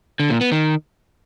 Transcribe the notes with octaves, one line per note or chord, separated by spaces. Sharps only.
D3
A#2
B3
D#3